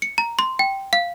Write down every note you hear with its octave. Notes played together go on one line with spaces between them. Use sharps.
C#7
A#5
C6
G5
F5